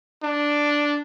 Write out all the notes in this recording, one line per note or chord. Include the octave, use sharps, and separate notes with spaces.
D4